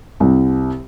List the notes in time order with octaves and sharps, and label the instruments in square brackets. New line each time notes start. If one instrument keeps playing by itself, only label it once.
[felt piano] C2